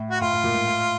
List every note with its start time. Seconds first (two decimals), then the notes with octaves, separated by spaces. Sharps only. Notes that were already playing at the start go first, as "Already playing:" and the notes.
Already playing: A2
0.11 F#4
0.21 A2 F4
0.33 A2
0.44 A#2
0.54 G#2
0.66 A2